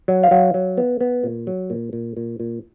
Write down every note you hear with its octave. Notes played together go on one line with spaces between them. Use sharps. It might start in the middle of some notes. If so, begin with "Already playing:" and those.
F#3
F5
F#3
F#3
B3
B3
A#2
F#3
A#2
A#2
A#2
A#2